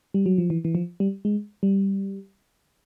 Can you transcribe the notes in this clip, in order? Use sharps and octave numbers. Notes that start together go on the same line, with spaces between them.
G3
F#3
F3
E3
E3
F3
G3
G#3
G3